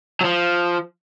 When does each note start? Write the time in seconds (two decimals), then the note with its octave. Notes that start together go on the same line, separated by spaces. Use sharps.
0.21 F#3
0.24 F3